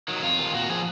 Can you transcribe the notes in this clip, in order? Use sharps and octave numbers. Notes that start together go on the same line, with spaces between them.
D#3 F#3
F2 F4
C3 D#3
A#2 F#4
F3 G#4